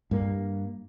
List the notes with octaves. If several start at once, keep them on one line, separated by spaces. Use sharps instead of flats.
G2 A#3